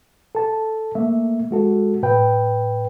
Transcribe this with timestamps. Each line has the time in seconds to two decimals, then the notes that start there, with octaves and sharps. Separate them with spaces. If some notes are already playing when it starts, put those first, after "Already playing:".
0.35 A4 A5
0.95 A3 A#3 E5
1.51 G#3 F#4 A4
2.03 A2 B4 G5